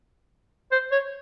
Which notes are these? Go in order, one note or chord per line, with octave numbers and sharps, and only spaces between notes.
C5
C#5